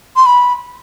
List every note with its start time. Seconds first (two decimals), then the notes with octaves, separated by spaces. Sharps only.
0.16 C6
0.26 B5